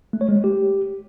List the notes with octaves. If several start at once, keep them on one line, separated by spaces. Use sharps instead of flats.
A3
C#5
G#3
A3
G4